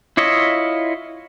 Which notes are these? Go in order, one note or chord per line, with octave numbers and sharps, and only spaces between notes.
E4 F4 C#5 D#5 E5